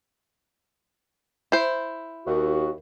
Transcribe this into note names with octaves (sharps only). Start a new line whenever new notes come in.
E4 C5
D#2 F#4